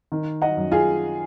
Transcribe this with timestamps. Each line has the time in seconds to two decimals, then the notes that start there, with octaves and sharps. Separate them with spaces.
0.12 D#3
0.42 D#5 F#5
0.57 F#2
0.72 F4 G#4